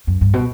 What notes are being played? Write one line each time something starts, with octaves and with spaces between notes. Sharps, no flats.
F#2
G2
B2